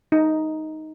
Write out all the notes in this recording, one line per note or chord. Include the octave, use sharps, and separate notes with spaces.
D#4